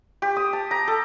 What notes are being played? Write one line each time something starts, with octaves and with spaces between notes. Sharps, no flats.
G4
D#6
A5
A#5
A4